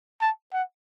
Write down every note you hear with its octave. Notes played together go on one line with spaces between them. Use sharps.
A5
F#5